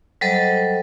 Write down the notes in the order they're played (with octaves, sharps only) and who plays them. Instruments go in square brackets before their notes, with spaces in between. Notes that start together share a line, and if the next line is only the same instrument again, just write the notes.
[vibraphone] F#3 G3 A4 C5 D#5